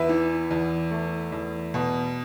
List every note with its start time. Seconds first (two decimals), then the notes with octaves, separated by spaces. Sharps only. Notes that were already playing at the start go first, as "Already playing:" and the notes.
Already playing: E2 B4 E5
0.09 E3
0.51 E2
0.91 A3
1.32 E2
1.74 B2